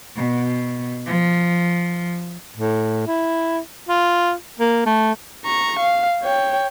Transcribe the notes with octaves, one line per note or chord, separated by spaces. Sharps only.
B2
F3
A2
E4
F4
A#3
A3
A#5 C#6
F5
C#5 G5